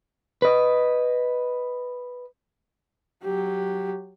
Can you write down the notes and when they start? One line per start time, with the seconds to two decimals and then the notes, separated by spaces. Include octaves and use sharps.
0.42 B4 D#5
3.23 F#3 G4